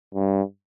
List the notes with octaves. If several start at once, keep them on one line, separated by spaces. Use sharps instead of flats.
G2